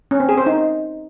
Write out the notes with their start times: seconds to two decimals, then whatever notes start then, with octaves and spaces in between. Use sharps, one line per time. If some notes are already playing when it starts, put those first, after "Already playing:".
0.11 C#4
0.20 C4
0.29 G#4
0.38 C5
0.46 D#4